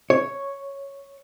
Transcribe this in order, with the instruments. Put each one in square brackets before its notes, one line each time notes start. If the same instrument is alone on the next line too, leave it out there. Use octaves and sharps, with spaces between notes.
[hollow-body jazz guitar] C#5